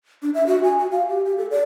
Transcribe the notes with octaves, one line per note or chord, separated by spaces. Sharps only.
D4
E5
F#4
G#5
F#4
F5
G4
G4
A4
D5